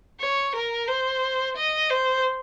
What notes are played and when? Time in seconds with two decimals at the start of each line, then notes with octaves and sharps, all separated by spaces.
0.21 C#5
0.55 A#4
0.88 C5
1.57 D#5
1.90 C5